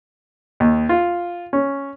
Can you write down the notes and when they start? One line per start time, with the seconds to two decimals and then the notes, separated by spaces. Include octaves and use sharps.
0.60 D#2
0.89 F4
1.53 C#4